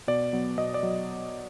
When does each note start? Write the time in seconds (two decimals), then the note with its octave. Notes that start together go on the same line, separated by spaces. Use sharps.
0.08 B2 D5
0.33 F#3 B3
0.58 B2 D#5
0.74 D5
0.83 F#3